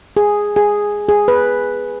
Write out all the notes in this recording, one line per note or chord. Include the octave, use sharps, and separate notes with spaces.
G#4
G#4
G#4
B4